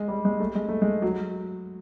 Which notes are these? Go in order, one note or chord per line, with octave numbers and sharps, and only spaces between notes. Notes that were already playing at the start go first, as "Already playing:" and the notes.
Already playing: G#3
G3
G#3
A3
G#3
A3
G#3
F#3